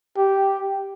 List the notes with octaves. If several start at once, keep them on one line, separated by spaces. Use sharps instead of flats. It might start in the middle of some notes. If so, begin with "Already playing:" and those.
G4